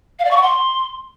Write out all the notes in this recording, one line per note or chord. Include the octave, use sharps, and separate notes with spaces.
F5
D5
C#6
F#5
C6